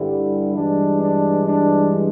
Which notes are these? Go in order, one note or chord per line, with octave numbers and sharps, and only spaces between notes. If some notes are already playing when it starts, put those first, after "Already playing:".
Already playing: G2 D3 G3 E4
G2 E3 G#3 D4
D4
D4